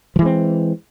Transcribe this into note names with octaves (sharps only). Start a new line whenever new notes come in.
E3 F3 G#3 C4